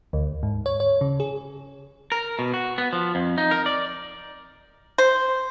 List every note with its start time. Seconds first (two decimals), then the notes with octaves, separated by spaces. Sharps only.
0.13 D2
0.43 G#2
0.66 C#5
0.80 C#5
1.01 C#3
1.20 G#4
2.12 A#4
2.39 B2
2.54 F#4
2.78 B3
2.93 F3
3.15 F2
3.38 D#4
3.51 A#4
3.66 D5
4.98 C5